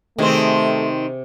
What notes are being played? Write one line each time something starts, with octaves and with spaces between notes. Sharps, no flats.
C3 D#3 A3 C4 G#4